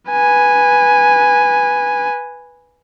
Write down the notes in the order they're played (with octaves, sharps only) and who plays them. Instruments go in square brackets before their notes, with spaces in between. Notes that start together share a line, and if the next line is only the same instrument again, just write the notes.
[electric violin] B4 G#5